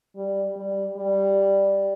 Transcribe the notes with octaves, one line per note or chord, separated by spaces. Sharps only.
G3
G3
G3